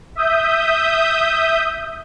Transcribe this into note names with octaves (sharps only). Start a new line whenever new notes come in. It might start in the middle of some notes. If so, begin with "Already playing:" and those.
E5 D#6 G6